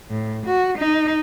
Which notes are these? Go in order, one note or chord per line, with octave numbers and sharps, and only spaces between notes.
A2
F#4
D#4